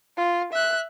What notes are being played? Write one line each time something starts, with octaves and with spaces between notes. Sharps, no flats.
F4
E5 F#6